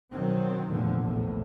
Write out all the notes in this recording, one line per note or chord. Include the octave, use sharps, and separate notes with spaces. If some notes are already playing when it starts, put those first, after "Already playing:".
B2 D#3 F#3 C4
F1 E2 A#2 D3 F3
A#1 E2 A2